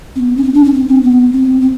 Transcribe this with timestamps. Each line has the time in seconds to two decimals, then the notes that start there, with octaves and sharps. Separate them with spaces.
0.16 C4
0.20 B3
0.37 C#4
0.44 C4
0.54 D4
0.64 C#4
0.74 C4
0.88 C4
1.03 B3
1.33 C4
1.61 C4